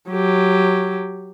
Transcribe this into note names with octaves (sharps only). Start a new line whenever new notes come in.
F#3 G4